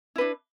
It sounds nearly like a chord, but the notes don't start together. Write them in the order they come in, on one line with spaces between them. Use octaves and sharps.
E4 B4 D4